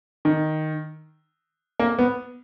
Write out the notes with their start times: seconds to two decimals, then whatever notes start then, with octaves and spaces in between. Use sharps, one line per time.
0.25 D#3
1.80 A#3
1.99 B3